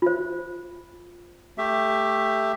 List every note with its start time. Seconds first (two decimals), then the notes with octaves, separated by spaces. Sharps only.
0.02 F4 C5
1.58 A3 G4 E5